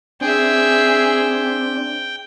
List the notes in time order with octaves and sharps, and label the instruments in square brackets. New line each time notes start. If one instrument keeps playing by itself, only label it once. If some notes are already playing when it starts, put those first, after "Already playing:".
[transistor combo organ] C4 D4 [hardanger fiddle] G#4 E5 [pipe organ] G5